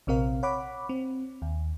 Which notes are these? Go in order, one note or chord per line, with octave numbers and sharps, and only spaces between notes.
A#1 C3 C4 A#4 F5
C#5 F#5 B5 D6
C4
D#2